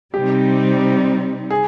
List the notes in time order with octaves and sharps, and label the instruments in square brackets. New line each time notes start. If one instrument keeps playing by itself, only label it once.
[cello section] C3 G3 C4 D#4 [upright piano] G4
[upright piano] G#4